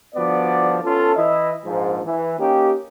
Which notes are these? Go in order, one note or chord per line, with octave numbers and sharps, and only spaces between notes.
G1 F3 B3 D4 F#4 D5
B3 C#4 F4 A4
E3 E4 D#5
A#1 G#2 F3
E3
A#3 C#4 D#4 G4